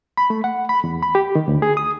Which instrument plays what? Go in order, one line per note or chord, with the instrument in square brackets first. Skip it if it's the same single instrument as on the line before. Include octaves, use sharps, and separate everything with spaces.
[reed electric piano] B5
A3
F#5
B5
E2
B5
G4
D#3
D2
G#4
D#6